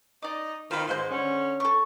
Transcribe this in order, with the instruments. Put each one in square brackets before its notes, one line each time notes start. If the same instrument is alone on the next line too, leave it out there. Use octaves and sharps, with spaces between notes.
[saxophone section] D#4 D#5 [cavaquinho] D5 D6
[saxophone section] D#3 F4 [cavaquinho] C5 B5
[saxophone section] G#2 D#3 G#3 [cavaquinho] C5 C6
[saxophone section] D3 C#4
[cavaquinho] A4 C#6